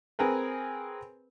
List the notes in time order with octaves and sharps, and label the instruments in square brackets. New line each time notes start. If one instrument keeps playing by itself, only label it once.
[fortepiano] C4 G#4 A#4 B4